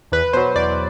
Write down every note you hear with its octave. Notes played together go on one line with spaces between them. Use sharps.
E2 B4
B2 F#3 C5
E2 D5